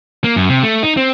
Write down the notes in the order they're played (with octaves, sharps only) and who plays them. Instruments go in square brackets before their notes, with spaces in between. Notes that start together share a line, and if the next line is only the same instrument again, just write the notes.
[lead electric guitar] A#3
F#2
C3
A3
D#4
C4